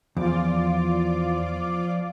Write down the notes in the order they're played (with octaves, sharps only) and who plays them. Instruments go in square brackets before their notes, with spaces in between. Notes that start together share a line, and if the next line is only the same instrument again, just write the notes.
[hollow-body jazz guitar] E2 [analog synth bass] F3 [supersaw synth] F4 D5 D6